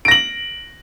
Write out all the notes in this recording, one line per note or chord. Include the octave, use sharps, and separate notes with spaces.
A#6 D7 F#7